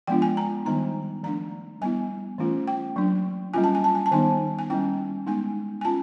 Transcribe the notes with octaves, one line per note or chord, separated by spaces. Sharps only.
F3 G#3 B3 D4 F4 G5
G#5
A#5
D#3 G3 B3 D#4 A#5
F3 A3 D4 A#5
G3 B3 E4 G#5
E3 A3 C#4 F4
G5
F#3 A#3 D4
G3 A#3 C#4 F4 G#5
A5
G#5
A5
G#5
A5
D#3 G3 B3 D#4 G#5
G#5
G3 A#3 C#4 E4 G5
G#3 B3 D#4 G#5
G#5
C#4 F4 A5